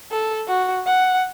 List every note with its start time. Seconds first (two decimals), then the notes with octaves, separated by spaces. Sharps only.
0.12 A4
0.48 F#4
0.86 F#5